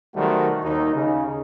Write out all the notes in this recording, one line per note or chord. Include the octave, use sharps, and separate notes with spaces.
B1 D#3 G3 A3 F#4 C5
D#2 D#4
C#3